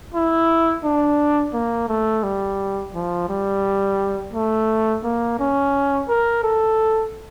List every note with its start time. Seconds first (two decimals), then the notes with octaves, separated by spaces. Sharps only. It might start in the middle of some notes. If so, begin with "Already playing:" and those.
0.14 E4
0.84 D4
1.54 A#3
1.89 A3
2.23 G3
2.95 F3
3.29 G3
4.34 A3
5.04 A#3
5.40 C#4
6.09 A#4
6.44 A4